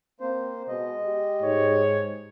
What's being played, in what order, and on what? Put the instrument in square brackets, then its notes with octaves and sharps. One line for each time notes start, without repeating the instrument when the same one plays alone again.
[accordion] A#3 C5 [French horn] C4
[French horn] B2 [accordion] G#3 D#5
[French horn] G4
[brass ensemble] G#2 C#5